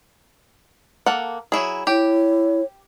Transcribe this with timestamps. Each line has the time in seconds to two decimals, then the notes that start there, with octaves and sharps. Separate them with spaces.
1.06 A#3 A4 F#5
1.52 F#3 E4 G#4
1.87 E4 G4 C#5